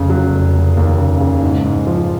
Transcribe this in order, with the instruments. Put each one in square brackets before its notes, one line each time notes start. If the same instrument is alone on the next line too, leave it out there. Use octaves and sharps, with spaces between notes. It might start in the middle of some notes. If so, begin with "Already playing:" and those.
Already playing: [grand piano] F1 C#3
F#3
F1
F1
D#2
C#3
C#3
G#2
G#2
F3